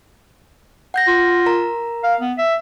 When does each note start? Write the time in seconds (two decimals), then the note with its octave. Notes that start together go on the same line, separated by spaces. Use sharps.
0.94 F#5 G6 A#6
1.07 F4
1.46 A#4 A#5
2.03 F5
2.20 B3
2.38 E5